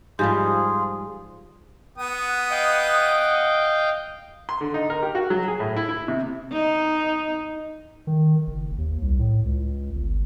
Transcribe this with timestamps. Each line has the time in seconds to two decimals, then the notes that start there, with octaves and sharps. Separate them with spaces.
0.19 G#2 F3 G3 F4 G4 G#4
1.98 B3 F#5 D#6
2.51 D#5 F5 G5
4.49 C6
4.61 D3
4.74 D#4
4.90 A#4
5.03 G4
5.15 F#4
5.30 F#3
5.48 G#4
5.60 A2
5.76 E4
5.89 E4
6.08 C3
6.52 D#4
8.07 D#3
8.47 F#1
8.78 D#2
9.02 C2
9.19 A2
9.45 C#2
9.95 G1